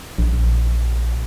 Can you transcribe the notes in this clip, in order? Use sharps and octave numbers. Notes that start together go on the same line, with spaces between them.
A#1